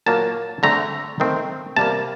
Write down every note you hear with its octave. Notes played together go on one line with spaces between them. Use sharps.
A#2 F#3 A#3 A5
D3 A3 C4 A#5
D#3 A3 C4
C3 G3 A#3 A5